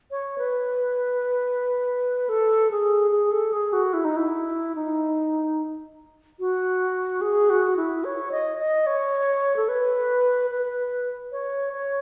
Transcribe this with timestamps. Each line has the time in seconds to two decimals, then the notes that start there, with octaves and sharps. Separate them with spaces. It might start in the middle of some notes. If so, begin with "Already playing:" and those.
0.11 C#5
0.38 B4
2.29 A4
2.71 G#4
3.11 G#4
3.32 A4
3.53 G#4
3.73 F#4
3.94 E4
4.05 D#4
4.16 E4
4.75 D#4
6.40 F#4
7.21 G#4
7.50 F#4
7.77 E4
8.04 C#5
8.32 D#5
8.59 D#5
8.86 C#5
9.56 A4
9.69 B4
10.50 B4
11.32 C#5
11.73 C#5